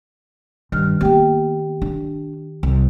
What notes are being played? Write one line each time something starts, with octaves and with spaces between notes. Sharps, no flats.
G2 D#3 F6
A#3 B3 G4 G5
D4
C2